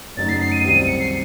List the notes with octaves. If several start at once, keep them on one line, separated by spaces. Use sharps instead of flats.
F#2 C#3 F#3 A3 D#4 A6
C7
C7
D#7
C2 C3 F#3 C4 D#7
D#7
C#7
C7